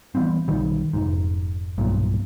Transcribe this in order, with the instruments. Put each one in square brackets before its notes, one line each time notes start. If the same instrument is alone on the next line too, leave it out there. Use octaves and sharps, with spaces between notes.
[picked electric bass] E3 G3 B3 C4
B1 D#3 G3
F1 G#2
B1 G2 A#2